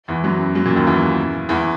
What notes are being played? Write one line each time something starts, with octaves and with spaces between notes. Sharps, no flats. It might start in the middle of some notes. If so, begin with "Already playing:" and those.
E2 E3
F#2 F#3
F#2 F#3
A#2
D#2 D#3
E2 E3
E2 E3